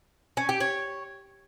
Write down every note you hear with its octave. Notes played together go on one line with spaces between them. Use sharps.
C#4
G4
C#5